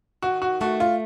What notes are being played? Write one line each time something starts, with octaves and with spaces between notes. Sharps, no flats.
D#3 F#4
F#4
A3 F#4
F4